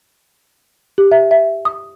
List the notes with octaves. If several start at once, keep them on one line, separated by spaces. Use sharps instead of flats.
G4
E5
E5
D#6